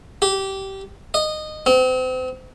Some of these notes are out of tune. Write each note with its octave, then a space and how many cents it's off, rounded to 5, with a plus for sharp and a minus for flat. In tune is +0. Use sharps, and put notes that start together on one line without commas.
G4 -20
D#5 -15
C4 -35